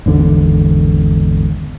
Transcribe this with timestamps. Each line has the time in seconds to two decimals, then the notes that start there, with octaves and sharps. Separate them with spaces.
0.06 G#1 E2 D3